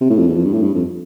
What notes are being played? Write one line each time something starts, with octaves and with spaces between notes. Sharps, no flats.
C3
A2
F2
E2
F2
G2
A2
G2
F2